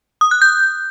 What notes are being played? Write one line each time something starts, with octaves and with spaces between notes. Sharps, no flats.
D#6
F#6
G6